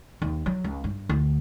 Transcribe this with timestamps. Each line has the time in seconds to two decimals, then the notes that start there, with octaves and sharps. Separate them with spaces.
0.22 D#2
0.46 F#3
0.64 C#2
0.84 G2
1.09 D2